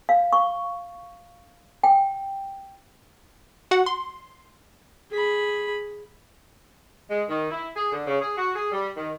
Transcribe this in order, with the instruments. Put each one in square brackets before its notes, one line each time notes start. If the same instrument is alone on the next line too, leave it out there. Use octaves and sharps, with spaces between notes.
[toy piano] F5
C#6
G5
[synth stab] F#4 F#5
C6
[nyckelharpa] G#4 B5
[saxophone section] G#3
D#3
E4
G#4
D3
C#3
G#4
F#4
G#4
G3
D#3